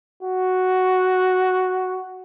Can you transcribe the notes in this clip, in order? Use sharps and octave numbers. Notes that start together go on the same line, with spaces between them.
F#4